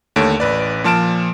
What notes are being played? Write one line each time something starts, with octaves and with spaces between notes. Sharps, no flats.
D#2 D3 A3 C#5 D7
A1 B4 D5
A#2 F3 A5 F6 D7 E7